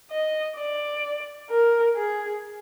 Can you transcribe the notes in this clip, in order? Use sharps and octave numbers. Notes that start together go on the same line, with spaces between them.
D#5
D5
A#4
G#4